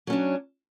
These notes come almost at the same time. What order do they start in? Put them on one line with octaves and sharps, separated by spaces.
F#3 C#4 D4